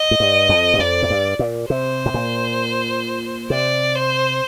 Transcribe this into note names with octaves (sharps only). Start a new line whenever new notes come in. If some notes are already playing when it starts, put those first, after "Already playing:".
Already playing: D#5
A2
G2
F2
G2
F2 D5
A2
G2
A#2
C3 C5
A2
A#2
C3 D5
C5